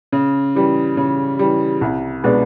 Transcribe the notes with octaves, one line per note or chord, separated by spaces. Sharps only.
C#3
E3 G3
C#3
E3 G3
C2
B2 G#3 B3 D4